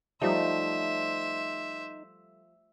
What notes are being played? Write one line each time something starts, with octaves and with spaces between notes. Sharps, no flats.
F3 G3 A3 D#4 C5 E5